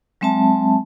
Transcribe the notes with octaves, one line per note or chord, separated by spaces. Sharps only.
F#3 G#3 C4 E5 A5